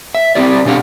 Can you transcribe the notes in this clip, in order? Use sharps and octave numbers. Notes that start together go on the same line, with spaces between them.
E5
C4 D4 E4 G4 D5
B2 D4 G4 F5 F#5